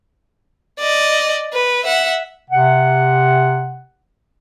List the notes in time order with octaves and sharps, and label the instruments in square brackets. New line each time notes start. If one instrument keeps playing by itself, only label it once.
[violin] D5 D#5
B4
E5 F#5
[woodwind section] C3 F#5